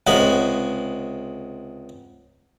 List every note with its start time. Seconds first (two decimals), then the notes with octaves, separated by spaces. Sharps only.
0.07 C#2 C3 G#3 B3 G#5 B5